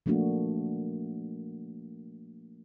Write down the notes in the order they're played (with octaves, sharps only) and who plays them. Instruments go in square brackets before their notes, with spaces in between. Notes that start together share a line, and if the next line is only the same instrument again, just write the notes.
[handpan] F3 A3 A#3 D4 F#4